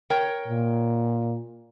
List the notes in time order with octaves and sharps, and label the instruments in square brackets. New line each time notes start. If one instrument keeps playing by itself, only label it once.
[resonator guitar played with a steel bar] A#4 C#5 G5
[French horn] A#2